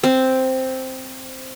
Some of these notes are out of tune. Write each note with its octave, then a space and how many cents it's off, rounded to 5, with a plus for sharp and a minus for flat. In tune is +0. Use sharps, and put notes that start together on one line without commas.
C4 +0